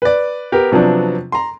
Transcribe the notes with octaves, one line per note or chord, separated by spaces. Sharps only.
B4 D5
B3 G4 A#4
C3 F3 F#3 B3 D4
A#5 C6